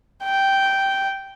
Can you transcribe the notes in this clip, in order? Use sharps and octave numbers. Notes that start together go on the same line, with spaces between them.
G5